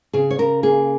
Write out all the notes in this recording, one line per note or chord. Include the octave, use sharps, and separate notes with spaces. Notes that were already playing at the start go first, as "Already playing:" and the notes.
C#3 G#4
C#5
C#3 A#4
A#3 G#4